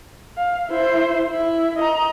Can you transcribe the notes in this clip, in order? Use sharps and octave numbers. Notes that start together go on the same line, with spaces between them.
F5
E4 C5
E4
D#5 A#5